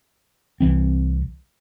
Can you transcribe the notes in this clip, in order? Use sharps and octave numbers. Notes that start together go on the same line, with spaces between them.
C2 E3 C4